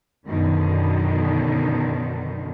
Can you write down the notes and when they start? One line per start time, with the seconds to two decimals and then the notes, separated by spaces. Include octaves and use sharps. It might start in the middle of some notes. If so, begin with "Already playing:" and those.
0.25 F#2 B2 D3 D#3